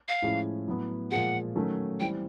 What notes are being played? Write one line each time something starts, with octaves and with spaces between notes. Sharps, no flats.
F5
A2 F3 G#3 C#4 E4
A2 F#3 B3
A#2 F3 G#3 F#5
D#3 F#3 A3 C#4
E3 G3 C4 G5